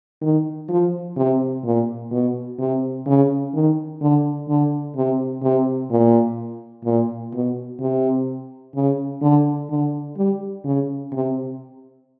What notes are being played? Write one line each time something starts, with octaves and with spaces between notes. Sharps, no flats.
D#3
F3
C3
A#2
B2
C3
C#3
D#3
D3
D3
C3
C3
A#2
A#2
B2
C3
C#3
D3
D3
G3
C#3
C3